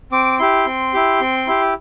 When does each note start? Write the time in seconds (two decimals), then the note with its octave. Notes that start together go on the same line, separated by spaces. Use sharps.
0.12 C4 D6
0.39 E4 G4 C6
0.66 C4
0.94 E4 G4
1.21 C4
1.47 E4 G4